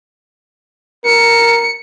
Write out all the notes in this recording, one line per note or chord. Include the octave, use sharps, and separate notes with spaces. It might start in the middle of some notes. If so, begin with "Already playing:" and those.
A#4 C#7